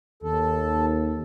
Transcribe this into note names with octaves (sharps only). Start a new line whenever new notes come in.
D#2 A4